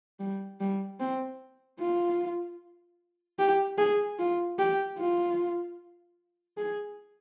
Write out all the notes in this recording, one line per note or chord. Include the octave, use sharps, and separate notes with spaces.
G3
G3
C4
F4
G4
G#4
F4
G4
F4
G#4